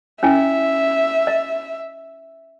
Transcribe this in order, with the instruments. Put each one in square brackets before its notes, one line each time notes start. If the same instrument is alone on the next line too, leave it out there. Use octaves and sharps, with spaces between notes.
[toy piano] C#4 E4 G#5 [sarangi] E5
[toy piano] D#5